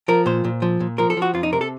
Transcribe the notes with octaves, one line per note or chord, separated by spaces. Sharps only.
F3 A#4
A#2 C5
A#2
F3
A#2
F3 A#4
A4
F3
F#4
F2 F4
D#4
C3 A#4
A4